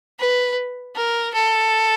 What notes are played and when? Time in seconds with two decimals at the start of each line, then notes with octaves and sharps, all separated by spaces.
0.19 B4
0.95 A#4
1.34 A4